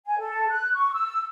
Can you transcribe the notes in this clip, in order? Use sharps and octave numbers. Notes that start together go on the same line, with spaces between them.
G#5
A4
F#6
C#6
E6